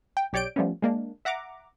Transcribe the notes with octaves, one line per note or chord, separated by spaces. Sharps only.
G5
B1 G4 C#5 D5 G6 D7
F3 G3 A3 B3 C#4
G#3 A#3 D4
E5 F#5 A#5 D6